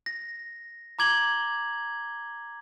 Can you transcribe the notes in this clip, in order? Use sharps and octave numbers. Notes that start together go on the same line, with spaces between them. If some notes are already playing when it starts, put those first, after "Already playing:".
A#6
A#5 D6 G#6 F#7 G7